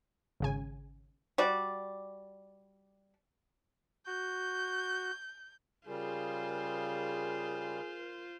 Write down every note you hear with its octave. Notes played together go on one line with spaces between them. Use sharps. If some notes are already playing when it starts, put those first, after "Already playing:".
G#1 C#3 G#5
G3 F#4 D5
F#4 G6
C#3 G3 F4 G#4 A#4 C5